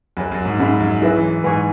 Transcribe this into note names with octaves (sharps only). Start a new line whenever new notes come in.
F#2 G#4 C#5 G#5 B5
F#2
G#2
G#2 C#4 G#4 E5 B5
F#2
F#3 E4 G#4 B4 E5
E3
G#2 B4 G#5 C#6